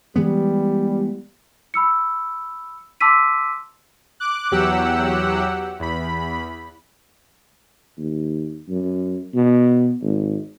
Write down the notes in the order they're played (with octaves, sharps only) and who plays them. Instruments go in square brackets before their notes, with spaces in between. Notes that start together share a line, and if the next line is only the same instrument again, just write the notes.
[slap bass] E3 G#3 B3 [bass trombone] G3
[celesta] B5 E6 C#7
A5 C6 D6 E6 B6 D#7
[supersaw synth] D6 F#6
E2 F#3 G4 F#5 E6
E2 B5
[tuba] D#2
F#2
B2
G#1